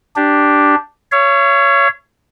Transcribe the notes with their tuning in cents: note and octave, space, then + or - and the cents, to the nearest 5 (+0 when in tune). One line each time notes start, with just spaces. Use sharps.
D4 +0 G4 +0
C#5 +10 F5 -40